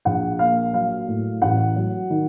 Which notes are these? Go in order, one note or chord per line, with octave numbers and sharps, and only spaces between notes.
A#1 F#5
A#3 F5
F#3 F5
A2
A1 F#5
F#3
D#3